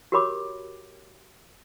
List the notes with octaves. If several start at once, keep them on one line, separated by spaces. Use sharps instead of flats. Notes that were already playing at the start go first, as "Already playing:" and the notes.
F#4 G4 A#4 C#5 B5 D6